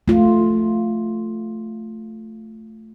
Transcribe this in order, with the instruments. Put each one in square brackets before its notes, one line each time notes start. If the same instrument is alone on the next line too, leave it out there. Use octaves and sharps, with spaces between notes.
[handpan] A3 F4